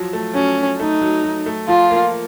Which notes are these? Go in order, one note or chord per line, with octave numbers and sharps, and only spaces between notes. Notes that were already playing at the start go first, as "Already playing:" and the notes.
Already playing: F3 F#3
A3
F#3 C#4
F#3
A3 D#4
F#3
F#3
A3
F3 F4
A#3